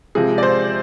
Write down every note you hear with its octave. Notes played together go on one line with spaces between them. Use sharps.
C3 F3 G#3 G#4
D5
C5